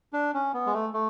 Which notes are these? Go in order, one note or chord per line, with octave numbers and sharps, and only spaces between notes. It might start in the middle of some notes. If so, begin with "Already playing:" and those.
D4
C#4
B3
G#3
A3
A3